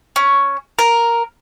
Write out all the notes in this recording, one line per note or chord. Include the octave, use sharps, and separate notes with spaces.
C#4
A#4